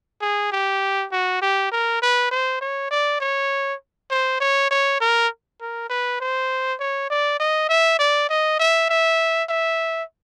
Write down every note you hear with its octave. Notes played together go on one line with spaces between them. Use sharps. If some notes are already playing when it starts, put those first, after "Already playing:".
G#4
G4
F#4
G4
A#4
B4
C5
C#5
D5
C#5
C5
C#5
C#5
A#4
A#4
B4
C5
C#5
D5
D#5
E5
D5
D#5
E5
E5
E5